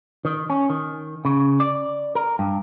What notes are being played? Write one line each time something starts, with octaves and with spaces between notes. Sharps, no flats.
D#3
C#4
D#3
C#3
D5
A#4
G2